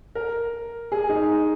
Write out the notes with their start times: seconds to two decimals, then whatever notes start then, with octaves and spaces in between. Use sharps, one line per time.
0.15 A#4
0.92 G#4
1.09 D#4